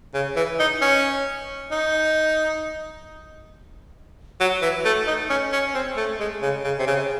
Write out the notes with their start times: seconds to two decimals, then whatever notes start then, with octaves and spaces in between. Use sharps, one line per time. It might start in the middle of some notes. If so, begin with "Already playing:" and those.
0.14 C#3
0.36 E3
0.59 D#4
0.81 C#4
1.72 D#4
4.40 F#3
4.62 E3
4.85 A3
5.07 D#4
5.30 C#4
5.52 C#4
5.74 C4
5.97 A3
6.20 G#3
6.42 C#3
6.64 C#3
6.79 C3
6.87 C#3